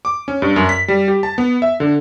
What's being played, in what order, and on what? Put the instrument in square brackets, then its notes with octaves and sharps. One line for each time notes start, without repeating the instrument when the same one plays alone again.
[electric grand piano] D6
C#4
G2
F#2
B6
G3
G4
A5
B3
E5
D3